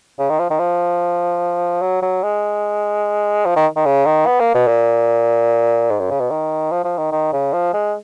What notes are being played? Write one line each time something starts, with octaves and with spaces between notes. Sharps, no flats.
C#3
D#3
F3
D#3
F3
F#3
F#3
G#3
F3
D#3
D#3
C#3
D#3
B3
A#3
B2
A#2
G#2
F#2
C#3
B2
D#3
F3
F3
D#3
D#3
C#3
F3
G#3